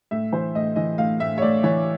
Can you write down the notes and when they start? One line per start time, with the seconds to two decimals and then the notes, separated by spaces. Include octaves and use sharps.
0.11 A2 E5
0.32 E3 C5
0.55 A2 D#5
0.76 E3 D#5
0.98 A2 F5
1.20 A2 E5
1.38 C#5
1.42 A2 D5
1.63 E3 C#5